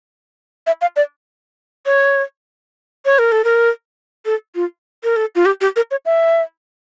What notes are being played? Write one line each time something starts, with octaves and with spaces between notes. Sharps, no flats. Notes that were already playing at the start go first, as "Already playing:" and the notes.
E5
F5
D5
C#5
C#5
A#4
A4
A#4
A4
F4
A#4
A4
F4
G4
G4
A#4
C#5
E5